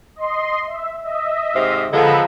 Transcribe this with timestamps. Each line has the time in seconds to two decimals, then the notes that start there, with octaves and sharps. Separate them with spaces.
0.16 D#5 C6
0.67 E5
1.03 D#5 E5
1.54 G#2 C3 F5
1.92 D3 F3 G#3 B3 A#5 B5 E6